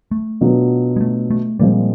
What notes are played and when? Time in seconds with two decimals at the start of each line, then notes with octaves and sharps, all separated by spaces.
0.11 A3
0.41 B2 F#3 B3 D4 F4
0.96 G#3
1.01 A3
1.30 A3
1.59 A#2 F3 G3 G#3 C4